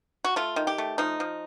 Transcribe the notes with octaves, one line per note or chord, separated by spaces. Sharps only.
F#4
A3 F4
D#3
G4
A3
F3 D#4
F3